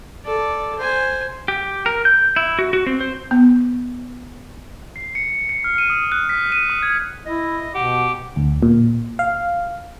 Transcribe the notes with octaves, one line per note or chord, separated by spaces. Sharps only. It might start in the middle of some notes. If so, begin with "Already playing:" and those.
A4 D5
C5 G#5
G4
A#4
G6
E4
F#4
F#4
C4
C5
B3
C7
C#7
C#7
F6
D#7
D#6
F#6
B6
D#7
D#6
G#6
E4 D#5
B2 G4 F#5
D2
A#2
F5